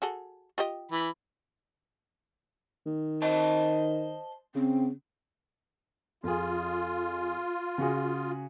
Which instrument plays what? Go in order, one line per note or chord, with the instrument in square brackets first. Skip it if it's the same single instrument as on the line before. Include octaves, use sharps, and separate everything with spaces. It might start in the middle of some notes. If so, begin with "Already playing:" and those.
[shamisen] F#4 G#4 A4
F4 G4 D#5
[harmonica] E3 B5
[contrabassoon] D#3
[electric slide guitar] C5 D#5 A5
[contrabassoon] C#3 [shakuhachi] C4
[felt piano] F2 G#4 [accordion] F4
[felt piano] C#3 F#4 G#4